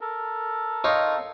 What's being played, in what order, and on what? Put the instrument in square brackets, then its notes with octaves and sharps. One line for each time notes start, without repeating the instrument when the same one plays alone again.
[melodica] A4 A#4
[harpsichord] D#4 F4 C#5